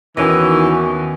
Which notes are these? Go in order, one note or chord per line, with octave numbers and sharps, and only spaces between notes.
D#2 D#3 E3 B3 C#4 F#4 D#5